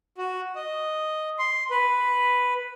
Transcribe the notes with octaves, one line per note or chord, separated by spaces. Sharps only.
F#4
D#5
C6
B4